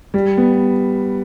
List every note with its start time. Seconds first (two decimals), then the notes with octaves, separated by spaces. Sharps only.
0.14 G3
0.38 B3